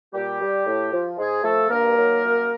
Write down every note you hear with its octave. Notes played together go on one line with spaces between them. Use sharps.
A#2 G3 G4
G3
A2
F3
G#2 G#3 G#4
F3 A3 A4
G2 A#3 A#4
D#3 F#3
F#2